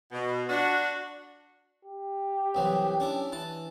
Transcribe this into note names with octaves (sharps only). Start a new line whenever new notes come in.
B2
D4 F#4
G4
C2 E3 F#3
C#4 D4 E4
E3 A5